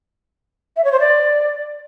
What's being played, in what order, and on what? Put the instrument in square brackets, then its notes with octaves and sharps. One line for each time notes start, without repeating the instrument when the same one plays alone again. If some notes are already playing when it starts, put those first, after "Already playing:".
[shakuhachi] E5
C#5
C5
D5